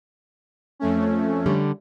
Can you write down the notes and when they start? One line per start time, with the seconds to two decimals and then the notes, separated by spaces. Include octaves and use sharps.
0.80 F2 A3 C#4
1.46 D3 G3